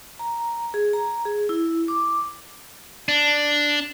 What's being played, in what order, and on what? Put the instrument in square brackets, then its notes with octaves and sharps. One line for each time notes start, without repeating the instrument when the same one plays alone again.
[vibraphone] A#5
G#4
A#5
G#4
E4
D6
[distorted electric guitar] D4